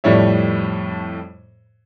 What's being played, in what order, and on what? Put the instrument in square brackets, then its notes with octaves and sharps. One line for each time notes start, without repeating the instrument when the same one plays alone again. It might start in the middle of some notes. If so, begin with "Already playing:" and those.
[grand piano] F2 A2 G3 C#5 E5